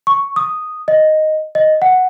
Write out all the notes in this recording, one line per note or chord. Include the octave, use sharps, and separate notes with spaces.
C#6
D#6
D#5
D#5
F#5